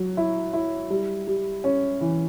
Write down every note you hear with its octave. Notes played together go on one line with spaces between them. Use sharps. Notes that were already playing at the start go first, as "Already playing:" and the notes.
Already playing: F#3
E4
E4
G3
G3
C#4
E3